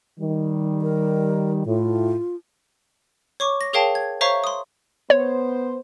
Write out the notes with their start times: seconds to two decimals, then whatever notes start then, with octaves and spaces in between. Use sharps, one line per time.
0.20 D#3 G3
0.82 A#4
1.66 A2 F4
3.40 C#5 C#6 D6
3.61 A#6
3.73 G#4 A#4 C#5 F5 G5 A5
3.95 G#6
4.21 C5 C#5 E5 F5 A#5 C#6
4.44 C6 D#6
5.10 B3 C5 C#5